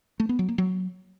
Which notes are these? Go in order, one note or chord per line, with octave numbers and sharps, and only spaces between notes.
A3
B3
F#3
A#3
F#3